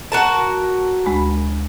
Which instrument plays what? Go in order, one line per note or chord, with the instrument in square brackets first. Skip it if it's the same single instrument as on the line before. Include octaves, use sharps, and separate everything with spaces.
[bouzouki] F#4 A#4 A5
[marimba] D2 G#3 B5